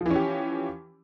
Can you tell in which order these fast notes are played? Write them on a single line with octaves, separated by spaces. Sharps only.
F3 E3 C#4 G4